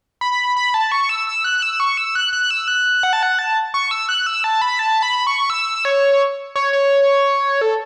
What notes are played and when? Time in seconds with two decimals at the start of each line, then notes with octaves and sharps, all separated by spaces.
0.21 B5
0.56 B5
0.74 A5
0.92 C#6
1.09 E6
1.27 E6
1.44 F#6
1.62 E6
1.80 C#6
1.97 E6
2.15 F#6
2.33 F#6
2.51 E6
2.68 F#6
3.03 F#5
3.13 A5
3.23 F#5
3.39 A5
3.74 C#6
3.91 E6
4.09 F#6
4.26 E6
4.44 A5
4.62 B5
4.79 A5
5.03 B5
5.27 C#6
5.50 E6
5.85 C#5
6.56 C#5
6.73 C#5
7.61 A4